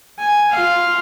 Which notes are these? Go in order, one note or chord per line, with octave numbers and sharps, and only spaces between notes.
G#5
F4 F5